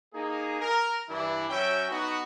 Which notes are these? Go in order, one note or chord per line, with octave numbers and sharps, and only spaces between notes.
A#3 D#4 G#4
A#4
G2 E3 D4 E4
F#3 C#4 E5 G5
B3 D#4 F#4